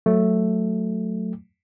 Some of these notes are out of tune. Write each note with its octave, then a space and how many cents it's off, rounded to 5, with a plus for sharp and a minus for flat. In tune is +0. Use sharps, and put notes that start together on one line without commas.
F#3 -5 A3 +0